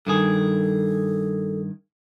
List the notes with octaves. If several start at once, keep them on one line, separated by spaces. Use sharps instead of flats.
G2 D#3 G#4 A4